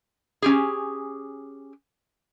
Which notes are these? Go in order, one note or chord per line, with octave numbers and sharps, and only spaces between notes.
C#4 G4 G#4